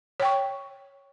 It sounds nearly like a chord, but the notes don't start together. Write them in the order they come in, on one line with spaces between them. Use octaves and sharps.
C#5 G5 C#6